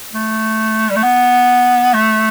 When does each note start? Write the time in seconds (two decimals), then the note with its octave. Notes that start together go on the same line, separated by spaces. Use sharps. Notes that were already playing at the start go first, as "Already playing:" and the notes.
0.13 A3
0.90 G3
0.96 A3
1.03 B3
1.94 A3